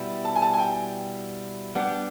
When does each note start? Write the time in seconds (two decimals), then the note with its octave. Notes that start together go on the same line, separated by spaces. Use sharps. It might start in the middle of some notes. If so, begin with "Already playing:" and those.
Already playing: B2 G3 B3 E4
0.25 A5
0.36 G#5
0.42 A5
0.54 G#5
0.58 G5
1.75 G3 B3 D4 G4 F#5